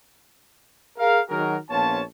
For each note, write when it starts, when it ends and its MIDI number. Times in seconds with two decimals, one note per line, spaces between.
0.97 1.19 68
0.97 1.19 70
0.97 1.19 77
1.29 1.56 51
1.29 1.56 54
1.29 1.56 66
1.29 1.56 68
1.29 1.56 70
1.70 2.01 34
1.70 2.01 59
1.70 2.01 61
1.70 2.01 65
1.70 2.01 73
1.70 2.01 81